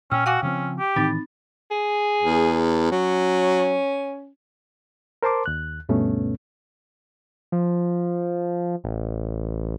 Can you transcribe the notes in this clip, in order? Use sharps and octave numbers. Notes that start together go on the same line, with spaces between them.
A#2 C#4 G5 E6 F6
F#4 F5 G#5 D6
C#3 F3 C4 C#4
G4
A2 D#3 E3 C4 D#4 B5 A6
G#4
E2
F#3 C#4
A#4 C5 A5 C6 D6
D#2 F#6
D2 G2 B2 A3 B3 C#4
F3
A1